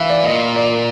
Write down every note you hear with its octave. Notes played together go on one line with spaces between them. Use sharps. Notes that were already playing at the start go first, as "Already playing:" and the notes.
Already playing: E3 E5 F5
D5
A#2 D#5
D5